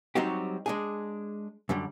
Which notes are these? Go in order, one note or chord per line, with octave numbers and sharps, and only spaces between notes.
F#3 G3 C4 D#4 F#4 G4
G#3 D4 G#4
F#2 D3 G3